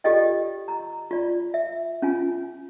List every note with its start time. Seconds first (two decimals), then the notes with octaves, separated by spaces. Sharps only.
0.04 F4 G4 A4 D5 D#5 G5
0.68 A#5
1.11 F4 D5
1.54 E5
2.02 C#4 F4 G#5